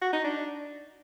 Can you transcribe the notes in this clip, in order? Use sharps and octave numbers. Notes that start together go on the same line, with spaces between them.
F#4
D#4
D4